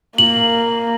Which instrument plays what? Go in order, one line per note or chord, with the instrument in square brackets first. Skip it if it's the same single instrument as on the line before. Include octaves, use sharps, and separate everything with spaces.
[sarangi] A#3 [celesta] F#7